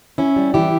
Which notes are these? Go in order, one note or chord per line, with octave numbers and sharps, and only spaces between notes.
C#4 E4
G3
E3 E4 G4